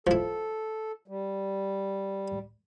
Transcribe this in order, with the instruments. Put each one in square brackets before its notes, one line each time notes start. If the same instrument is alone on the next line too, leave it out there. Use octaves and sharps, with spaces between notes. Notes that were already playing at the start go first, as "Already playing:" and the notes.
[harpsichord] F3 E4 [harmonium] A4
[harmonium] G3